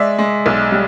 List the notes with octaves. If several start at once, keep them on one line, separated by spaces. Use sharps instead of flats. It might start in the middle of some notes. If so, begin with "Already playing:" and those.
Already playing: G#3 D5 E5
G#3
B1
G3